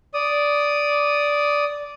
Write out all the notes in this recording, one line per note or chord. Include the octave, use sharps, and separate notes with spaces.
D5 D#6